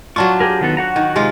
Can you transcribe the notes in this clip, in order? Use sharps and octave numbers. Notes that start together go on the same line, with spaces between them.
F#3 D4 F4 C#6
G4 G#4 A#4
D#3 B3 A4
F#4 F#5 A#5
D#3
C3 G#3 F4